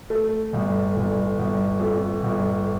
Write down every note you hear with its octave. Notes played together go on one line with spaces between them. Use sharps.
A3
G1
G1
G1
F2
G1